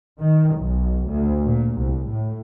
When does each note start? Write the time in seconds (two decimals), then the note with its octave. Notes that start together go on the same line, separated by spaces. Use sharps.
0.21 D#3
0.57 B1
1.09 D2
1.45 A#2
1.79 C2
2.09 A2